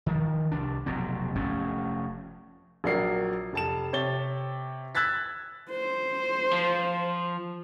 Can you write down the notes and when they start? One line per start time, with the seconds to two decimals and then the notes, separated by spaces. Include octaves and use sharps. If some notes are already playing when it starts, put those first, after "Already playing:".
0.06 D#3 F3
0.52 C2 D4
0.86 F1 B2 F#3 C4
1.35 F1 F2 A3 C#4
2.84 A#1 F#3 D4 A#4 C7
3.53 F1 A5 E7
3.93 C3 C#5 A6 G7
4.95 E6 F#6 G#6 A6 B6
5.70 C5
6.53 F3